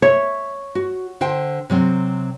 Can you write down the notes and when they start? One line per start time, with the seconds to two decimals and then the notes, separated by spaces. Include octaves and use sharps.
0.02 C#5 E5
0.75 F#4
1.21 D3 C5 G5
1.70 C3 F#3 C4